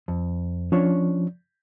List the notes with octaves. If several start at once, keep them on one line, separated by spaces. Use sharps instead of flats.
F2
F3 C#4 D4 C#5